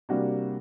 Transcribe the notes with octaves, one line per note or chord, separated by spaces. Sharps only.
C3 G3 A#3 D4 F#4